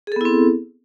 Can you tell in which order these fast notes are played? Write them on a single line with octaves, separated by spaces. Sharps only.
G#4 A4 B3 E4 C4